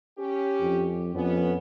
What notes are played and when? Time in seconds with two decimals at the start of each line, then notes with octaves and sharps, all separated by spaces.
0.18 C#4 G4
0.61 F2
1.15 F2 B3 C#4